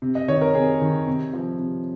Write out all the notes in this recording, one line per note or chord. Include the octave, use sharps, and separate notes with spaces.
C3
D#5
D#3 C#5
A#4
C3 G#4
D#3
C3
F3
C3